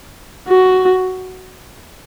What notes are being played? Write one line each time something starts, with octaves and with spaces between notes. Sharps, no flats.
F#4